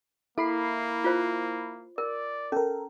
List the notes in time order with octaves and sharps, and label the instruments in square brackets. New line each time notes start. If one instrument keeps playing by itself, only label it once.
[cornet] A#3 [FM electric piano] E4 B5 C7 [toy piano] A4
[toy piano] F4 C5
[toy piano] A#4 [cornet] D5
[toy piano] C#4 [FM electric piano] A4 A#4